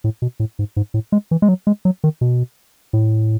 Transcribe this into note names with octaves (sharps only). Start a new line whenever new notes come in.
A2
B2
A2
G#2
G#2
A2
G#3
E3
G#3
F#3
G#3
F#3
D#3
B2
A2